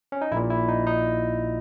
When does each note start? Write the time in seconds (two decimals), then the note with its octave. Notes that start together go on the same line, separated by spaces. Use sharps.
0.12 C#4
0.21 D#4
0.32 A#1 E4
0.36 A#2
0.50 E4
0.68 D#4
0.87 D#4